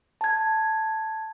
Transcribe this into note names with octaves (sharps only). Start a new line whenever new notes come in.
A5 G#6